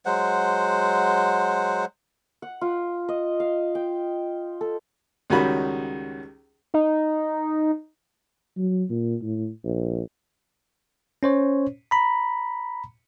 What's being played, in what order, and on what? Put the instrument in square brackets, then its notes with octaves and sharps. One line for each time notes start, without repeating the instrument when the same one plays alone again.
[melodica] F#3 G#3 C5 F#5
[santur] F#5
F4
D#5
F5
G5
A4
[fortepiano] C#2 D#3 G3 C#4 F#4 B5
[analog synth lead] D#4
[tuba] F#3
A#2
A2
A#1
[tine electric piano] C#4 C5 C#5
A#5 B5